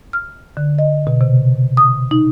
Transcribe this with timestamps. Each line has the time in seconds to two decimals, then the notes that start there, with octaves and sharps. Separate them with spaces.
0.13 F6
0.57 D3
0.79 D#5
1.07 B2
1.21 C3
1.77 D#6
2.11 D#4